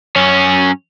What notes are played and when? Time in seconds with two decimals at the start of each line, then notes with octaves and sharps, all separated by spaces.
0.16 F#2 C#4